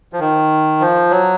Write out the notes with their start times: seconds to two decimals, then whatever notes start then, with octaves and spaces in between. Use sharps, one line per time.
0.13 F3
0.20 D#3
0.80 F3
1.10 F#3